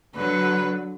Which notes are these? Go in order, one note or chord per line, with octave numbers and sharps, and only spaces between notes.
D3 F#3 B4